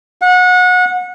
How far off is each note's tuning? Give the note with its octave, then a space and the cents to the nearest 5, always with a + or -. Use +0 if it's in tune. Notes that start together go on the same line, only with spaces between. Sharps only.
F#5 -30